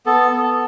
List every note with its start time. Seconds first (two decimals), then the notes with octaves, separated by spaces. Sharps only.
0.06 B3 A4
0.32 B3